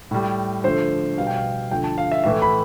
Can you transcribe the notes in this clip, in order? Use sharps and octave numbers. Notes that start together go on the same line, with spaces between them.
A2 G3
D3 F3 A3 C5
B2 G3 F5
G5
F5
D3 F3 A3 G5
A5
F5
E5
A2 E3 A3 E5
B5